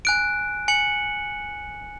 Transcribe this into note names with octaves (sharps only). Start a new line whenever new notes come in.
G#5 F#6 D7
G#5 C#7 F#7